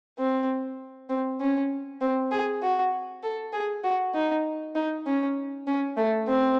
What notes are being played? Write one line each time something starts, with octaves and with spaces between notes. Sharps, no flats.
C4
C4
C#4
C4
G#4
F#4
A4
G#4
F#4
D#4
D#4
C#4
C#4
A3
C4